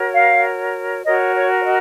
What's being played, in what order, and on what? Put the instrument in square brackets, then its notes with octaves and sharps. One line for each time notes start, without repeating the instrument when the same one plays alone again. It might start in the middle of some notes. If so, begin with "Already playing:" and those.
Already playing: [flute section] F#4 A#4 C#5
F5
F#4 A#4 C#5 D#5
C#5
C#5
D#5